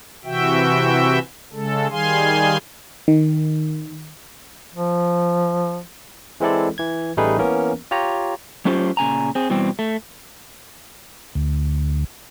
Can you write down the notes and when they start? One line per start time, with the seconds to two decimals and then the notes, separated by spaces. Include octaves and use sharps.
0.24 C3 E3 F#4 E5 G5
1.53 C#3 G#3 A4
1.90 D#3 G3 G#4 F5 G#5 C6
3.08 D#3
4.74 F3
6.40 E3 G#3 C4 E4 A4 D5
6.78 E3 G#6
7.17 A1 G3 A3 D#4 G#4 B4
7.38 E3 A#3 B3 C#4 A#4
7.91 F4 G4 C#5 A#5
8.65 F#3 A3 C#4 F4 G4 C5
8.97 A#2 C#3 G#5 A#5
9.35 C4 G#4
9.50 B2 E3 G3 C4
9.79 A3
11.35 D2